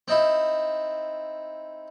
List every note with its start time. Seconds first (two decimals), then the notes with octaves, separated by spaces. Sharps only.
0.08 C4 D#4 E4